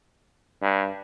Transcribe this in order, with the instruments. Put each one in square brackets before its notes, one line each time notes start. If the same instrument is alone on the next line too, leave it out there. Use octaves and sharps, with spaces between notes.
[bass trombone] G2